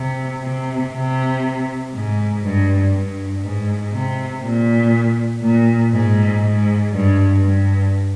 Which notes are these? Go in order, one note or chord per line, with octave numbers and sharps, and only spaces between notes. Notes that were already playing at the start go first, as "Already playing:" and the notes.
Already playing: C3
C3
C3
G#2
G2
G2
G#2
C3
A#2
A#2
G#2
G#2
G2
G2